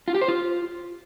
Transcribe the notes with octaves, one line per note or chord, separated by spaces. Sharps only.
F4
G4
C5
F4